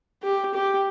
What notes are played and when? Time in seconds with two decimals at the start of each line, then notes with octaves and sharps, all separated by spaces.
0.23 G4
0.54 G4